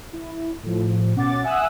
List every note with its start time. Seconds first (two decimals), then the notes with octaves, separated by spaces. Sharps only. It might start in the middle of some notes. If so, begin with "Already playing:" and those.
0.13 E4
0.63 A2 F3
1.15 B2 C#4 F#5 D6 A6
1.44 E5 F#5 G#5 D#6 E6 F#6